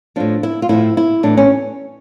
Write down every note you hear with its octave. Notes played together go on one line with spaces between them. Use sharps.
A2 F3 D4
E4
F4
A2 F3 E4
E4
A2 E3 D4
C#4